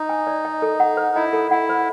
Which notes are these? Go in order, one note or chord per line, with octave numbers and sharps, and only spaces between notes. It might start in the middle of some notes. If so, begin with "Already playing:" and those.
Already playing: D#4
G#5
D5
D#5
A4
F#5
C5
E4 D#5
A4
E4 F#5
C5